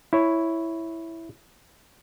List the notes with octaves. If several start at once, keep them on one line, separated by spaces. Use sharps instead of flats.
E4 C#5